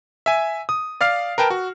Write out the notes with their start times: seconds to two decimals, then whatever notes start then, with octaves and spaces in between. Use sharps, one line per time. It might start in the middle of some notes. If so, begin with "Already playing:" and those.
0.26 E5 G#5
0.69 D#6
1.01 D5 F5 F6 C7
1.38 A#4 B4 G5 A5
1.50 F#4